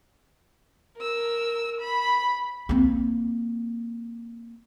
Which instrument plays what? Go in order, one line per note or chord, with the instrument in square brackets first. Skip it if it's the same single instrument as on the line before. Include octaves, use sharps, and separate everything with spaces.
[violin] A#4 E6
B5
[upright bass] A#3 C4